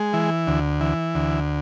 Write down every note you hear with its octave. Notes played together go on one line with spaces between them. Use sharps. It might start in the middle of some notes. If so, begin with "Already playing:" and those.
Already playing: G#3
E3
D2
E3
D2